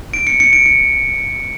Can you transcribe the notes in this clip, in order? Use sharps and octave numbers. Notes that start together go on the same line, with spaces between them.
D7
C#7
C#7
D7
C#7